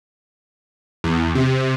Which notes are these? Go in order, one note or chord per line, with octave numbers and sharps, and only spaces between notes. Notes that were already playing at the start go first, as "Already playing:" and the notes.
E2
C3